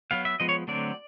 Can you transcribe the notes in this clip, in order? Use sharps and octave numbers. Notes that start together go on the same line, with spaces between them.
F#3 B3 F5
E5
F3 G#3 B3 D#5
C#5
D3 F#3 A3 C4 D5